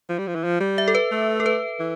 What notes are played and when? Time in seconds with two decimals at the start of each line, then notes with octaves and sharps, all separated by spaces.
0.09 F3
0.19 G3
0.27 F3
0.35 E3
0.44 F3
0.60 G3
0.78 E5
0.88 A4
0.95 B4
1.12 A3
1.40 A4
1.46 B4
1.80 E3